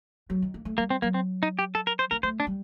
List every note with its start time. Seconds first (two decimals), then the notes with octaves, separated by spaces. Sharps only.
0.30 F#3
0.42 D#3
0.54 A#3
0.65 A3
0.78 G3 A#3
0.90 C4
1.02 F#3 A#3
1.14 C4
1.43 D#4
1.59 G4
1.75 A4
1.87 A#4
1.99 C5
2.11 A#3 A#4
2.23 A3 C5
2.40 D4
2.47 G3